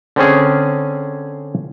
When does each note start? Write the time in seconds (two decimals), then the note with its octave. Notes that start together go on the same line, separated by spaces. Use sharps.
0.16 D3 C4 C#4 G#4